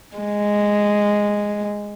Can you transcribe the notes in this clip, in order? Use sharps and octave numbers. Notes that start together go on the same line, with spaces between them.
G#3